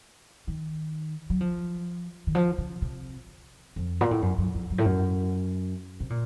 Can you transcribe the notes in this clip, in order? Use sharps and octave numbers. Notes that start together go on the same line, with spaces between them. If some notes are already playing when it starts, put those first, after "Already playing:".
D#3
F#3
F3
D#3
F3
C#3
C3
F2
A#2
A2
F#2
F#2
F2
F#2
A2
F#2
C3
A#2